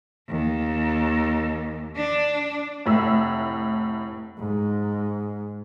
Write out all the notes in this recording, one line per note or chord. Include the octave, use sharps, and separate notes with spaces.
D#2
D4
F1 A2 E6
G#2